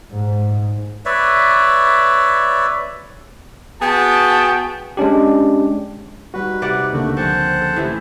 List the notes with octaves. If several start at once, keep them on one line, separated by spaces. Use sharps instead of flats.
G#2
B4 C#5 D5 E5
B3 F#4 G#4 G5 A5
G#3 C#4 D4 G4
G3 D#4 F#4 B4
C3 D5 F#5
C#2 D3 A3 A#3 F#4
F3 C4 C#4 C5 F#5 A5
A4
A2 E3 E4 G4